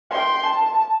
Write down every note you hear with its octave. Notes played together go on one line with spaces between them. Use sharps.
G5 C6
A5